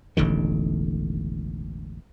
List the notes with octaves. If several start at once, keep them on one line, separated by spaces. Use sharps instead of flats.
E1 A1 D3 D#3